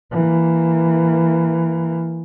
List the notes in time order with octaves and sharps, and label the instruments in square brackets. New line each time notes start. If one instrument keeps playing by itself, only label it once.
[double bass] E3 A#3